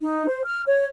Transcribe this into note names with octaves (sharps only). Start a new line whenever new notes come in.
D#4
C5
F6
C#5